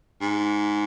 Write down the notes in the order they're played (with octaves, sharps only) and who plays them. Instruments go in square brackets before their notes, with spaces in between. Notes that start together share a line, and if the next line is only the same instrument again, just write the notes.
[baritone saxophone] G#2